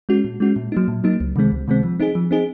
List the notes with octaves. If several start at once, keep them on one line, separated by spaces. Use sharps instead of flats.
G#3 C#4 F#4
A#2
G#3 C#4 F#4
A#2
F#3 A#3 D#4
A#2
F#3 A#3 D#4
C#2
C3 D#3 G#3 C4
C#2
C3 D#3 G#3 C4
F3
C4 D#4 G#4
F3
C4 D#4 G#4